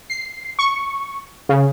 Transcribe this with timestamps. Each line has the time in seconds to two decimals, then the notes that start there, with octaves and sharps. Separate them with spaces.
0.10 C7
0.59 C#6
1.49 C#3